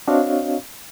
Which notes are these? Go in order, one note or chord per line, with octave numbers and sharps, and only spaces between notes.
C4 D4 F#4 C#5 D#5 F5